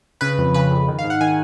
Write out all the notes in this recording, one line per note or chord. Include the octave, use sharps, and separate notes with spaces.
C#3 B4
F2
C#3 B4
F2
D#3
F5
G#2
F#5
D#3 G#5